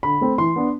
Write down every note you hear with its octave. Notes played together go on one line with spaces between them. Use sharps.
D3 B5
A3 C4
E3 C6
B3 D4